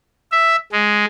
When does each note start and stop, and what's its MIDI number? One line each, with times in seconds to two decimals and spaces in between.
0.32 0.56 76
0.72 1.06 56